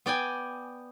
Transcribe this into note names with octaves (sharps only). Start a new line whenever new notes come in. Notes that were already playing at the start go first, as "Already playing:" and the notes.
B3 D5 G5 G#5